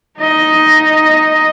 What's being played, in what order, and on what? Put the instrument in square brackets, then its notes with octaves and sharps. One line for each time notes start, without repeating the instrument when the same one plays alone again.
[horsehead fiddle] D#4 D#5